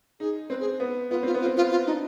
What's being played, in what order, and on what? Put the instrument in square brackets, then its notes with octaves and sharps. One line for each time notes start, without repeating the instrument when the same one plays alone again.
[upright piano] D#4 [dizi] G#4
[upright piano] C4 [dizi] B4
[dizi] G#4
[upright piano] B3
[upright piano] B3 [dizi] F4
[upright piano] C4 [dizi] F4
[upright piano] B3
[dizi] F4
[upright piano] C4
[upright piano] B3 [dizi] F4
[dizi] F4
[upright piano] D4 [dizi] D#4